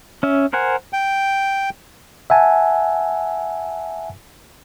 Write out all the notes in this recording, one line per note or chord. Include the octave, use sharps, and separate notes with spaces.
C#4 E5
A#4 C5 F#5 G#5
G5
E5 F#5 G#5 A5